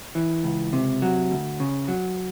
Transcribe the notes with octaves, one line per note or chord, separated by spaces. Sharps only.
E3
C#2
C3
F#3
D2
C#3
F#3